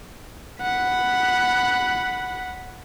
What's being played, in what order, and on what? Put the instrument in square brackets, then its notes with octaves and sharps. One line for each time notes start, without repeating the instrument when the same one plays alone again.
[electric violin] F#5 B5